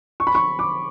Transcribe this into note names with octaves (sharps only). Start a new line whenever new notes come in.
C#6
B5
C#6
D6